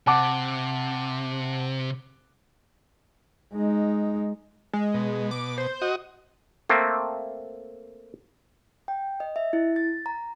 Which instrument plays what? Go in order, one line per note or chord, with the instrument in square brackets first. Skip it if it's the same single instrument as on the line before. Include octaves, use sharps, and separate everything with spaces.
[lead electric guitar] C3 [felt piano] F#5 A5 D6
[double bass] G#3 D#4
[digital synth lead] G#3
[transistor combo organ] B2
[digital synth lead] D6
C5
[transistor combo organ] F#4 D#5
[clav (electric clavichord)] A3 A#3 C4
[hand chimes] G5
D#5
E5
E4
A6
A#5